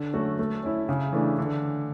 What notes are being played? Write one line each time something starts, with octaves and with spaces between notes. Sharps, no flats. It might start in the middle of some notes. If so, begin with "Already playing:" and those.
Already playing: D3
F#3 A3 C#4 F#4
A3
C#4 E4
C#3
E3 A3 D4
D3